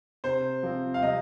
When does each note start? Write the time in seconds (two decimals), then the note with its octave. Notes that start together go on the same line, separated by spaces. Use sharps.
0.24 C3 C5
0.63 F3 C4
0.94 F5
1.02 C3 D#5